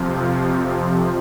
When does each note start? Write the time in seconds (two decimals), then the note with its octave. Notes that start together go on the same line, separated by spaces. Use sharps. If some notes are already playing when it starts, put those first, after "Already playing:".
Already playing: F2 C3 F3